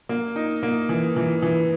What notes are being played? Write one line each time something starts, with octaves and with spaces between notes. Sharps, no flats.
A#3
D#4
A#3
E3
E3
E3